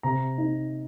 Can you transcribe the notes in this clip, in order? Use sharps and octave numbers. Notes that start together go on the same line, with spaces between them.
C3 A#5
D#4